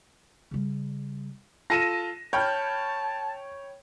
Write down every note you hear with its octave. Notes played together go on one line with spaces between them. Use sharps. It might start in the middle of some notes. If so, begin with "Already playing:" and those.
C#3 G3
F4 A4 A#6 D#7 E7
C#5 G5 A5 B5 F6 G6